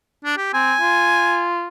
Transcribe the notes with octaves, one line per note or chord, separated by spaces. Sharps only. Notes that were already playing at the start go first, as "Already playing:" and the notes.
D4
G4
C4 G#5
F4